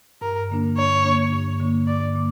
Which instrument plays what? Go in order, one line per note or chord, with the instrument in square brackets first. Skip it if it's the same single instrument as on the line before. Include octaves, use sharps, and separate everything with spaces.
[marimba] G2 [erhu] A#4
[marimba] D3 A#3 D4
[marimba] G2 [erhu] C#5
[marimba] D3 A#3 D4
G2
D3 A#3 D4
[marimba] G2 [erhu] D5
[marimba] D3 A#3